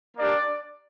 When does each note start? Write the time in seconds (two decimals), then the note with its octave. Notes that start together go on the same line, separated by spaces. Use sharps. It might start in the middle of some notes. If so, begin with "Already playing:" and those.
0.17 A#3 D4 G4 D5